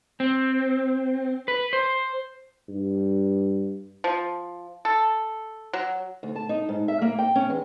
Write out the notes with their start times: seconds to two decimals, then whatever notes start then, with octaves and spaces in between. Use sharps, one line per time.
0.20 C4
1.48 B4
1.73 C5
2.69 G2
4.04 F3
4.85 A4
5.73 F#3
6.23 D2
6.35 A5
6.49 D#4
6.69 G#2
6.88 E5
7.02 A#3
7.18 G5
7.36 C#4
7.50 E2